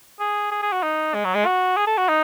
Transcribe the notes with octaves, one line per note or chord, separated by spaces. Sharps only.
G#4
G#4
G#4
F#4
D#4
G#3
F#3
G#3
F#4
G#4
A4
F#4
D#4